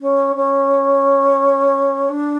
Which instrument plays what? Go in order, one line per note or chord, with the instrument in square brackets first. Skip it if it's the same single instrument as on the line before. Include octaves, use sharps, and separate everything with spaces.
[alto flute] C#4
C#4
D4